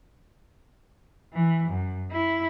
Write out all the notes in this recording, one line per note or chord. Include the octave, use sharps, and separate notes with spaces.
E3
F#2
E4